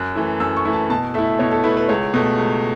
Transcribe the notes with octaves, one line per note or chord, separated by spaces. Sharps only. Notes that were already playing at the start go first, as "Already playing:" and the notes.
Already playing: F#2 F#6
E3 A3 E4
F#2 E6
C#6
E3 A3 E4
A5
B2 A5
A3 E4 E5
B2 C#5
A4
A3 E4 B4
B4
C#2 C#5
B2 A3
C#2